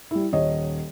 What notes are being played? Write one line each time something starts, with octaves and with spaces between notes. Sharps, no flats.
G3 E4
D#1 C#5 D#5